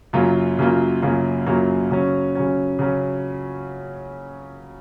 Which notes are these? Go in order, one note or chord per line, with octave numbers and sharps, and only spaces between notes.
F#2 C#3 F#3 A#3 F4
F#2 C#3 F#3 A#3 F4
F#2 C#3 F#3 A#3 F4
F#2 C#3 F#3 A#3 F4
C#3 F#3 C#4
C#3 F#3 C#4
C#3 F#3 C#4